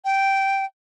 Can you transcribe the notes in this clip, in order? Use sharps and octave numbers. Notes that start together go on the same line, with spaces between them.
G5